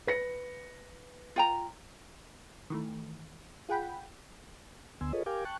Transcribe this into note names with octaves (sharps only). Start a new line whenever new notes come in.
B4 A#6 C#7
F4 G5 A#5
D#3 E3 A3
F4 G#4 F#5 G5 B5
D2 D3 B3 G#5 C6 E6
F4 G#4 A4 B4 C#5 D#5
G4 A#4 F5 G5 G#5 D6
G5 A5 C#6 F#6